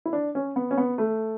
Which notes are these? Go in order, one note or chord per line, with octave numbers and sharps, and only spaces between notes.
E4
D4
C#4
B3
C#4
B3
A3